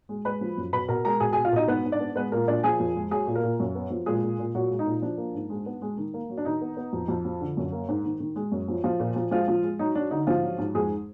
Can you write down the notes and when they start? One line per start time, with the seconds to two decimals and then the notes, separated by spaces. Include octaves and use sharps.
0.09 G#3
0.25 G#3 B4 B5
0.41 F3
0.57 F#2
0.73 B2 B4 B5
0.88 B2 A#4 A#5
1.05 G#3 A#4 A#5
1.20 B2 G#4 G#5
1.33 G#4 G#5
1.37 B2
1.45 F4 F5
1.52 B2 D#4 D#5
1.68 G#2 B3 B4
1.85 G#2
1.92 D4 D5
2.00 B3
2.15 G#3 B3 B4
2.32 A#2 A#3 A#4
2.47 A#2 D4 D5
2.63 F3 G#4 G#5
2.80 F2
2.96 G#3
3.11 F#3 G#4 G#5
3.27 A#2
3.35 A#3 A#4
3.44 A#2
3.60 F#2
3.75 B3
3.90 F3
4.06 A#2 G#3 G#4
4.23 A#2
4.39 A#2
4.54 A#2 F#3 F#4
4.71 G#3
4.79 D#4
4.86 A#2
5.02 F3 D4
5.18 A#3
5.35 G#2
5.50 G#3
5.66 B3
5.82 G#3
5.97 D#3
6.14 A#3
6.30 F#3
6.37 D4
6.45 D#3 D#4
6.61 B3
6.77 B3
6.93 F2
7.08 F2
7.25 F3
7.41 D3
7.57 F#2
7.72 A#3
7.89 G#2
8.05 D#3
8.20 D#3
8.36 G#3
8.52 F#2
8.68 F3
8.84 F3 F4
9.00 A#2
9.16 F3
9.31 F3 G#3 F4
9.48 F3
9.63 G#3
9.79 F#3 D#4
9.95 F#3 D4
10.11 D3 D#4
10.27 G#2 F3 F4
10.43 F#3
10.58 G#2
10.75 F2 G#3 G#4